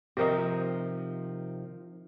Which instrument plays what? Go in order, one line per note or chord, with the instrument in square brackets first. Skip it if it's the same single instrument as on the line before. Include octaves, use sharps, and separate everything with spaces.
[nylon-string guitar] C3 D#3 F3 [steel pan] G4 A#4 D#5